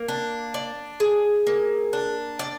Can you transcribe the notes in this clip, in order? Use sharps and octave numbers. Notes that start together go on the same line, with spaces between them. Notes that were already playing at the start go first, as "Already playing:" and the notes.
Already playing: A#3
D4
D5
G#4
A#3
D4
D5